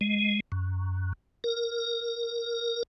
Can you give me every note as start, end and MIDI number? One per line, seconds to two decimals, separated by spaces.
0.01 0.40 56
0.52 1.13 42
1.44 2.83 70